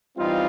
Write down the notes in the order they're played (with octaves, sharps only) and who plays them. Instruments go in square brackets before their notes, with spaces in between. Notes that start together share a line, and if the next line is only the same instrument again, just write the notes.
[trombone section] E3 G3 C4 D#4 F4